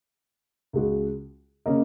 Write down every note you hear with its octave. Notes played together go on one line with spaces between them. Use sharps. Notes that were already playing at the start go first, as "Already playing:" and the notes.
C#2 C#3 G#3 F#4
C#3 A#3 C#4 A#4 D#5